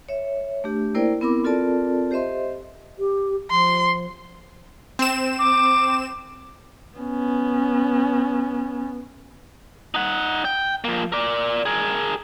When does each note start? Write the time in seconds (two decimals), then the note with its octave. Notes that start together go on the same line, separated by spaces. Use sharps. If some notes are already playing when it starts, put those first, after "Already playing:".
0.09 C#5 E5
0.64 A3 D4 G4
0.95 A#3 E4 A#4 C5 D5 G5
1.21 B3 C4 E4 A#4 B5 D6
1.44 C4 F4 A4 A#4 D5 A5
2.11 G4 C5 D#5 E5 C6
2.99 G4
3.50 F3 C6
4.99 C4 E7
5.39 D6
6.98 B3 C#4
9.95 D#4 F#5
10.45 G5
10.84 F3 A#3
11.12 A#4 D5
11.66 G#4 A#4